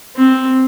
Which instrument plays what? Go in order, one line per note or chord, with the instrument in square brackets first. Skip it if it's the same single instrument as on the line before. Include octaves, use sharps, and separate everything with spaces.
[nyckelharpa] C4